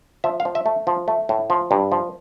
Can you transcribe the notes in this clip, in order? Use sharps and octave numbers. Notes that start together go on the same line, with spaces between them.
F3 E5
F5
F3
E5
A3
F3
A3
A2
F3
G2
F3